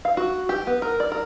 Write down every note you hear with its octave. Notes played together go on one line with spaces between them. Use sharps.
F5
F#4
G4
B3
A#4
D5
A#4